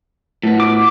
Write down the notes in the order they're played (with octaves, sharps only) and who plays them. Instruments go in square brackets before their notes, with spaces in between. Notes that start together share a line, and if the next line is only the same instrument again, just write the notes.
[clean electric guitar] A2 B3
[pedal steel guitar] D6